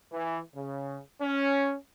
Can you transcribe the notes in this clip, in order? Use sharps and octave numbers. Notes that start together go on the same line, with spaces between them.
E3
C#3
C#4